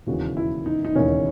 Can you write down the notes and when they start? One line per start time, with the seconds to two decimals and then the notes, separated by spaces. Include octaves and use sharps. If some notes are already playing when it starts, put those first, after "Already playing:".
0.07 E1 D#2 C#3 E3 F#4
0.37 E4
0.66 D#4
0.85 D#4
0.95 E1 D#2 C#3 E3 C#4